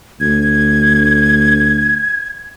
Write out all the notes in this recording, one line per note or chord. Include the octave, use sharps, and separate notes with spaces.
D2 G#6